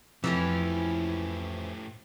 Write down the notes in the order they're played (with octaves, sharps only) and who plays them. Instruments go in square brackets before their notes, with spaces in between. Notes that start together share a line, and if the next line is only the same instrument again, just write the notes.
[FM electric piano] F2 [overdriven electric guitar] A2 G4 [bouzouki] E3 F3 C#4